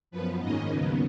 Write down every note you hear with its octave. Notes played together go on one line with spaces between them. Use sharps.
F#2 F3 B3 B4
G#2 D#3 A#3 C#4 D#5
D#2 C#3 F#3 B3